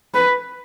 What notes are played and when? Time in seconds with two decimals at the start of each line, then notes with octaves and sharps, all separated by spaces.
0.14 B4